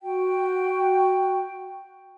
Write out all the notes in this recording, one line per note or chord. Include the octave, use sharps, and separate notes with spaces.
F#4 G5